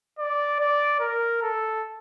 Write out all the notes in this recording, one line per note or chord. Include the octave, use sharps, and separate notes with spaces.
D5
D5
A#4
A4